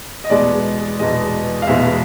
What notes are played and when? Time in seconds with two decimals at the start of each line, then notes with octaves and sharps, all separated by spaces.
0.24 D#5
0.30 E2 B2 G#3 B3 D5
0.99 E2 B2 G#3 B3 D#5
1.62 F5
1.67 E2 B2 G#3 B3 E5